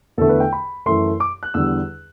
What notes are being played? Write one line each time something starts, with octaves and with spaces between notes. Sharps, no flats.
E2 D3 A3 A4
B4
G5
B5
F#2 E3 A3 C6
D6
F#6
E2 D3 G3 E6